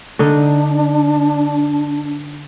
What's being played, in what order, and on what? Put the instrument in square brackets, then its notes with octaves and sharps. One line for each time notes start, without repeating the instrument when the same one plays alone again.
[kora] D3 D#4 [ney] D4